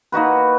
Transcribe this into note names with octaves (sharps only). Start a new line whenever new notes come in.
A#3 D#4 F#4 B4